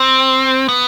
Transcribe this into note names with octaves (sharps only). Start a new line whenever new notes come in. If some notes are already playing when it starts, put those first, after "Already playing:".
Already playing: C4
B3